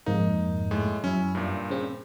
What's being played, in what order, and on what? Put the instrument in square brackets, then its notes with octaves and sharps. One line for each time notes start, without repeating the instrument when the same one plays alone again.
[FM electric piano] F2 G#2 A#3 [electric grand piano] D#4
[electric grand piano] A2 G#3
[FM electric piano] F#2 E4 [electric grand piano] C#4
[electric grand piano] G2 A#2
[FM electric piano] C#3 C4